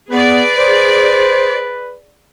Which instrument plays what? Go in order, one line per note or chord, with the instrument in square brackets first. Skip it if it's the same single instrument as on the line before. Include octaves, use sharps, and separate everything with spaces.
[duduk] B3 [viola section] G#4 D5 [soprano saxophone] B4
[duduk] C5